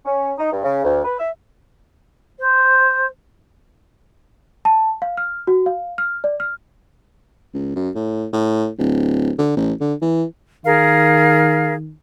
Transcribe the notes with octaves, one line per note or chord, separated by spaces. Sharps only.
C#4
D#4
G2
C#3
D2
B4
E5
C5
A5
F5
F6
F#4
F5
F6
D5
F6
C#2
F#2
A2
A2
D1
D3
A1
D3
E3
D#3 G#4 A#4 F5